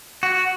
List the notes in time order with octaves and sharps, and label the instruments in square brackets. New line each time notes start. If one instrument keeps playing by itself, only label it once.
[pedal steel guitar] F#4